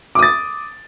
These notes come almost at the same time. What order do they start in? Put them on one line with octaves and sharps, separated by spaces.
D6 D#6 A6